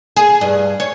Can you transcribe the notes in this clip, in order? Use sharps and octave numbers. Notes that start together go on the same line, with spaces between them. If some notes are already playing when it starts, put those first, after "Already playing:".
G#4
G2
C#5